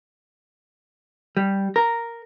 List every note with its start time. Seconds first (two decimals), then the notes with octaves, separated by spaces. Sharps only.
1.37 G3
1.76 A#4